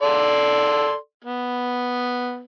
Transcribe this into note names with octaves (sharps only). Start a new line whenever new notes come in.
A4 D5 C6
B3